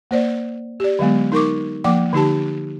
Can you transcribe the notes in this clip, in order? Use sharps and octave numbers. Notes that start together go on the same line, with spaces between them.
A#3 C5 D5
G4 D5
D3 F#3 G#3 B3
D#4 A#4 C#6 D6
F3 A#3 G5 D6
D3 D#4 G4 A5